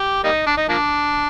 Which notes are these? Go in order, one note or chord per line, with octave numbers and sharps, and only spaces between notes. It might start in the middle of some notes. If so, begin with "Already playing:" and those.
Already playing: G4
G3 A#3 D#4
D4
D#4
F3 A#3 D4